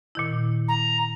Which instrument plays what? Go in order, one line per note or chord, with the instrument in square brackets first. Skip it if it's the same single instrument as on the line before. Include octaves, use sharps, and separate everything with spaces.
[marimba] A#2 D#3 E4
[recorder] A#5